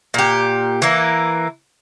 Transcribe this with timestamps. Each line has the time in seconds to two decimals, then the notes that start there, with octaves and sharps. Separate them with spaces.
0.14 A#2 G4
0.82 E3 A#3